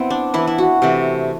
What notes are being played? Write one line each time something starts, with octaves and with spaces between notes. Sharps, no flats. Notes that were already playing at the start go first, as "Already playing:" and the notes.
Already playing: B3 C4 E4
D4
E3 B3 E4
E4
F#4
C3 E3 A3